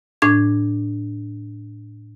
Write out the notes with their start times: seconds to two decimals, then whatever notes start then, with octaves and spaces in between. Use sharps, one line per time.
0.22 A2 D4 G#6